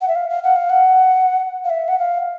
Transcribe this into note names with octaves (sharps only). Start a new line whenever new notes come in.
F#5
E5
F5
F5
F#5
F5
F#5
F5
E5
F#5
F5